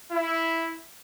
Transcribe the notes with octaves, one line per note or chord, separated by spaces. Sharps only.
E4